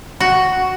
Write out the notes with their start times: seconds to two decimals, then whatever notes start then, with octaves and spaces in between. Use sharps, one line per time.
0.20 F#4